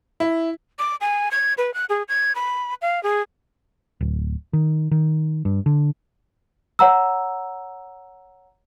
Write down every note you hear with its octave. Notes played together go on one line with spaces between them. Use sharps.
E4
D6
G#5
G#6
B4
F#6
G#4
G#6
B5
F5
G#4
D1
D#3
D#3
G2
D3
C#5 F#5 A#5 E6